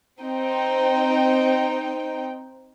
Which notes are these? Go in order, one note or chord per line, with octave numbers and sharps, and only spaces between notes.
C4 D#4 G5